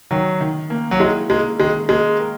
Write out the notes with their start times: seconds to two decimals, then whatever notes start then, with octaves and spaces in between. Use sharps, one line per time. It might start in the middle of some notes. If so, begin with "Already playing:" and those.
0.11 D#3 F#3
0.41 D#3
0.70 A#3
0.91 F#3
1.00 G#3 E4
1.30 G#3 A#3
1.60 D#3 G#3
1.89 G#3 A#3
2.20 A#4